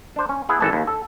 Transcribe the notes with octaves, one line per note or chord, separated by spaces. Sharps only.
D4 C5
C#4
B3 E4 G#4
G#1 E3 A4 E5 A5
D#2
A4